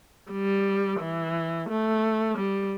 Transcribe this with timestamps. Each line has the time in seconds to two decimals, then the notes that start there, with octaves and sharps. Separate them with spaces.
0.32 G3
1.00 E3
1.69 A3
2.38 G3